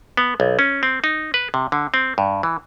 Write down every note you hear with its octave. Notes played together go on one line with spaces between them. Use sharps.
B3
B1
C#4
C4
D#4
B4
C3
D3
C4
G2
E3